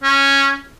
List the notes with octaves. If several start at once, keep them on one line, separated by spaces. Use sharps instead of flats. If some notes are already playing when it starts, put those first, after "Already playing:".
C#4